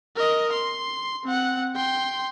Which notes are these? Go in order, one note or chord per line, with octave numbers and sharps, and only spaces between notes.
A#4 D#5
C6
C4 F#5
G5 C6